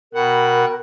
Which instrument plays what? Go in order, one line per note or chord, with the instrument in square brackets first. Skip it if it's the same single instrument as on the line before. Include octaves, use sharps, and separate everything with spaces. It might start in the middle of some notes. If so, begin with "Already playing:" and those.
[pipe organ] B2 F#5 [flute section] A#4 G5 B5